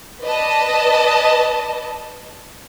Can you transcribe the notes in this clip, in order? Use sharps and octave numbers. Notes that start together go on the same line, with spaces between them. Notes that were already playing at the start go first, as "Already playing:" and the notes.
B4 D5 D#5 A5